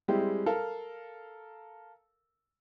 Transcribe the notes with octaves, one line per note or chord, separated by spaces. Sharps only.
G3 G#3 C4 E4 G4
A4 A#4 F5